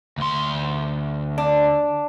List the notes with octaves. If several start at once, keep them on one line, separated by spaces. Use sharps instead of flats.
D2 C6
D4